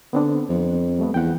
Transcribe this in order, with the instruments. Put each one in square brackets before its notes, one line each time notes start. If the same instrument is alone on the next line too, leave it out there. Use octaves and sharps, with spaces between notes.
[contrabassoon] D3 [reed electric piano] B3 C4 D4
[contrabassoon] F2
[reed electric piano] G3 A3 B3
[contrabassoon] E2 [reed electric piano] F#5 G5